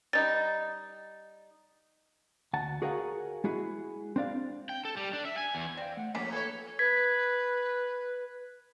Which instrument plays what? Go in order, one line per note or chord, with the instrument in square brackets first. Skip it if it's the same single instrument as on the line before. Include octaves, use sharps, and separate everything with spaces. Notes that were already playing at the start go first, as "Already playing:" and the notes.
[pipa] G3 D#4 [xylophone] A6
[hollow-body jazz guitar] D2 F#5 A5
F#4 G#4 A#4 C#5 F5 F#5
G#3 E4 F#4 G#4
C4 D4 D5 F5
[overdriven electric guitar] G5
A4
G3
D4
E5
G#5
E2
[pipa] C4 [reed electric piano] D5 F5 [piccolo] G5
[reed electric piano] A3 [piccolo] F#5
[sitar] F2 C#4 [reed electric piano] A#3 [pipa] D4 G#4 A#4 [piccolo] B6
[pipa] E3 [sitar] A4 C#5 [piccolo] G#6
[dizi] B4 [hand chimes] G#6 B6